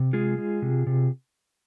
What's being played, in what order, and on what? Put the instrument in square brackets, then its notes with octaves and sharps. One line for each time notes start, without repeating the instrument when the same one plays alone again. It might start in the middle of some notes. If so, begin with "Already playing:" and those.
Already playing: [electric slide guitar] C3
G#3 F4 G#4
G#3
C3
C3